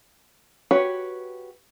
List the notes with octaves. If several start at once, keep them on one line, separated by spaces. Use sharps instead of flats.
F#4 G4 B4 C#5